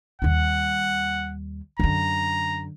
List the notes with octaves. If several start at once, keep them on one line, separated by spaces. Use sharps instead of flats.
D#2 G3 F#5
F#2 D3 A#5